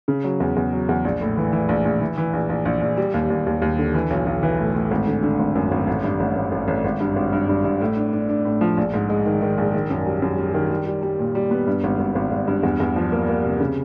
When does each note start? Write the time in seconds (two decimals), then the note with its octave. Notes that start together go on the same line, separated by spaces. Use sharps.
0.08 C#3
0.24 F#3
0.40 E2
0.56 E2
0.73 F#3
0.89 E2
1.05 A#1
1.21 A2
1.37 E3
1.53 E3
1.69 A#1
1.85 A#1
2.01 E3
2.18 E3
2.33 A#1
2.50 A#1
2.65 A#1
2.82 A#1
2.97 G3
3.14 D#2
3.30 D#2
3.46 D#2
3.62 D#2
3.79 D3
3.94 E3
4.10 B1
4.26 B1
4.43 E3
4.59 A2
4.75 A2
4.91 G#1
5.08 D3
5.23 D3
5.39 G#1
5.55 F#2
5.71 G#1
5.87 A1
6.04 G2
6.20 A1
6.36 A1
6.52 A1
6.68 A1
6.84 G#1
7.00 G2
7.16 G#1
7.32 G2
7.49 G2
7.65 G2
7.81 A2
7.97 D4
8.13 D4
8.29 D4
8.45 A2
8.61 F3
8.77 A#1
8.94 G#2
9.09 G#3
9.26 D#3
9.42 D#3
9.58 A#1
9.74 D#3
9.90 F#2
10.06 G3
10.22 F#2
10.38 G3
10.54 D#3
10.71 G3
10.86 G3
11.02 G3
11.19 A#2
11.35 G3
11.51 B3
11.67 G2
11.84 G#1
12.00 G#1
12.15 G#1
12.32 G#1
12.48 G2
12.63 E2
12.80 E2
12.96 F3
13.12 A#3
13.28 A#3
13.44 C3
13.60 C#3